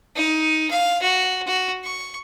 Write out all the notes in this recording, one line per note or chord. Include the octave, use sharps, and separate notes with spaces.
D#4
F5
F#4
F#4
C#6